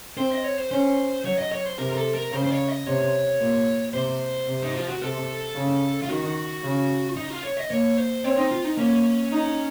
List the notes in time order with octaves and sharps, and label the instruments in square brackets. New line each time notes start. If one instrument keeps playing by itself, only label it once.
[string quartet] C4 [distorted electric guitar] C5
[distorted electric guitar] D#5
C#5
C5
[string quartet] C#4 [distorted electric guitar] C5
[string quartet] F#3 [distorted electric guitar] C#5
[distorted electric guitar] D#5
C#5
C5
[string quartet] C3 [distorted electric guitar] A#4
[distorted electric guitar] A#4
A4
A#4
[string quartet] C#3 [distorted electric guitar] C5
[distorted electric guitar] C5
C#5
D#5
[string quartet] C3 [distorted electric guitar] C#5
[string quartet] A#2
[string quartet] C3 [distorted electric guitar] C5
[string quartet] C3
[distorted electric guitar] D#4
F4
F#4
[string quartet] C3 [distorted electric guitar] A4
[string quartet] C#3
[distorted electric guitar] F4
[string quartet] D#3 [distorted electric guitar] F#4
[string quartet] C#3
[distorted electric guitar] D#4
F4
C#5
D#5
[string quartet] A#3 [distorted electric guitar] C#5
[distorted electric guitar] C5
[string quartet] C4 [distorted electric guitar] C#5
[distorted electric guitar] D#4
F4
D#4
[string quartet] A#3 [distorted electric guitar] C#4
[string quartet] D#4